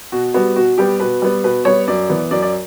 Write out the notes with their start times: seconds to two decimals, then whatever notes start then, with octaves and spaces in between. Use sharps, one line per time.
0.12 B2 F#4
0.34 G3 B3 F#4
0.56 B2 F#4
0.78 G3 B3 G4
1.00 B2 B4
1.22 G3 B3
1.43 B2 B4
1.65 G3 B3 C#5
1.87 F#2 D5
2.09 E3 B3
2.31 F#2 D5
2.42 D5